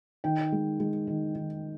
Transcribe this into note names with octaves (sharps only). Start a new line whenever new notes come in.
D#3 G5
G#3
G#3
D#3
D#3